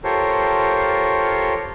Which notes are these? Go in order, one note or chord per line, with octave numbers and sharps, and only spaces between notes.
F4 G4 A4 A#4 C5 C#5